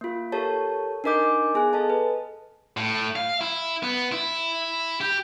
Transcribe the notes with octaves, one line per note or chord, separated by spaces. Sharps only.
A#3 F4
G4 A4 A#4 C#5 A5
D4 D#4 A#4 D#5 D6 G6
B3 G#4 G#5 F#6
A4 D#5 A5
B4
A2
F5
E4
B3
E4
G4